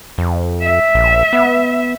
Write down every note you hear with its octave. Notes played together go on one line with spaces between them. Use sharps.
F2
E5
A#1
B3